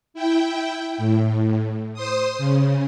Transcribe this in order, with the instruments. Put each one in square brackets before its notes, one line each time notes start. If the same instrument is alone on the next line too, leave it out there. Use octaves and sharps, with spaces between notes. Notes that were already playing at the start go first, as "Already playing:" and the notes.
[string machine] E4 G5
A2
C5 C6 D#6
C#3